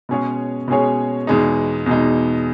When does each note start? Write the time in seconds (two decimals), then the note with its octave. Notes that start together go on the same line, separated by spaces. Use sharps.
0.09 B2 G#3 C#4 G#4 C#5
0.68 B2 G#3 C#4 G#4 C#5
1.27 E2 B2 G#3 D#4
1.86 E2 B2 G#3 D#4